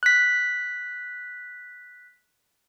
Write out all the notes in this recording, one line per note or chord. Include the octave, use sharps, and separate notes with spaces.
F#6 B6